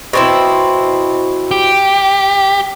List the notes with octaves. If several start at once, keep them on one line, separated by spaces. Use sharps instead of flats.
B2 C4 E4
G4